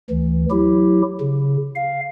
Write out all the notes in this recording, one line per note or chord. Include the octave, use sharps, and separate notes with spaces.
D2 E3
F#3 E4 G4
C#3
F5